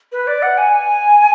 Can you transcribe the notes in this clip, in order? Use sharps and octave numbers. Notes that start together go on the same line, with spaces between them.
B4
D5
F#5
G#5